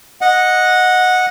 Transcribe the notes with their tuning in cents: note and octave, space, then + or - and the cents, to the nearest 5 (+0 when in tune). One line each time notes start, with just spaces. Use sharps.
D#5 +0 F#5 -10